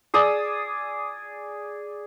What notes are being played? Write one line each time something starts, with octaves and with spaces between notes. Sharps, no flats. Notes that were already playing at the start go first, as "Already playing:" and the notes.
G#4 D5 D#6 E6